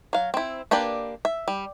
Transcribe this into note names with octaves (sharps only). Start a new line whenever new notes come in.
F#3 F5
C4 E4
A#3 D4 G4 B4 D5
E5
G3